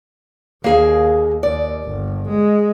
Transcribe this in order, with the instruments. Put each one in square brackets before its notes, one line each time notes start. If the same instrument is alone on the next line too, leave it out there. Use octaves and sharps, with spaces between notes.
[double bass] D#2 [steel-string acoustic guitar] A#3 G#4 F5
[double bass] D#2 [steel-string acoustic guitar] D5
[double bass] G1
G#3